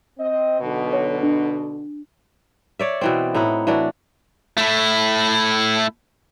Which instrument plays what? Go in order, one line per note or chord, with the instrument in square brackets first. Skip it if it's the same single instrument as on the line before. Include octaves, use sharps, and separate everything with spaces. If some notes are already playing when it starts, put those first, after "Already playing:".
[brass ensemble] C4 D#5
B1 B2 D3
[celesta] C#5
D4
[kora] C#5 D5 E5
B2 E3 C4
A2 D#4 E4 F#5
E3 D4 F#4 D5
[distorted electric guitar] A3 E4